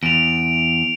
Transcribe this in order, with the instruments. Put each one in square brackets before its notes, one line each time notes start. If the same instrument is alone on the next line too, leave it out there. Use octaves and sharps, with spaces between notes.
[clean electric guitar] E2 [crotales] D7 F7